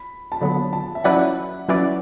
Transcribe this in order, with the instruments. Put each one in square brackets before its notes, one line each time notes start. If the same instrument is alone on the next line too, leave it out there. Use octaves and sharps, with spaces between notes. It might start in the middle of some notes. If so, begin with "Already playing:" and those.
Already playing: [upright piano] B5
A5
[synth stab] D3 F#3 B3 [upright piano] B5
[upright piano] A5
E5
[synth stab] F#3 C#4 E4 B4 D5 [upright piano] F#5
[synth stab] F#3 C#4 E4 B4 D5